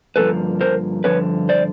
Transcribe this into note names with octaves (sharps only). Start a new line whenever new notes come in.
G2 D3 F3 A#3 A4 B4
A#4 C5
G2 D3 F3 B4 C#5
C5 D5